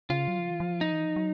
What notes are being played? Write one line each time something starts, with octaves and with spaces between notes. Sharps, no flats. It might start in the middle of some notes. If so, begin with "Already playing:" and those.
C#3 F4
F#3
F3
E3
F3
D#4
E3
F3
F#3